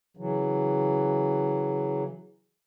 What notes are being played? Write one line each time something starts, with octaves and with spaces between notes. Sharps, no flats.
C#3 E3 F#3